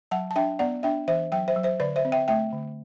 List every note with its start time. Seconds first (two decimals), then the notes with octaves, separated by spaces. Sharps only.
0.11 F#3 F#5 A5
0.31 A5
0.36 D4 E5 G5
0.59 B3 D5 F#5
0.83 D4 E5 G5
1.08 E3 C5 E5
1.32 F#3 E5 G5
1.48 C5 E5
1.56 F#3
1.63 C5 E5
1.80 D3 B4 D5
1.96 C5 E5
2.05 C4
2.12 E5 G5
2.28 A3 E5 G5
2.53 D3